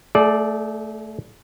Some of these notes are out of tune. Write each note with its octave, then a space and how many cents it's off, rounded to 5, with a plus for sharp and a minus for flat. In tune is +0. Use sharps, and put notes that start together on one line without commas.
A3 +0 G#4 +45 D5 +0